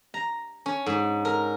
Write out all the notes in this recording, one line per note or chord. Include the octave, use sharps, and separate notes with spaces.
A#5
C#4
G#2
A#4